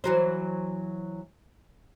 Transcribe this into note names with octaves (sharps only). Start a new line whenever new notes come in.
E3 F#3 C5